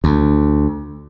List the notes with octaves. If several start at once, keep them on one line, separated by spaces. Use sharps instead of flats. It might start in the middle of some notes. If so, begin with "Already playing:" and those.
D2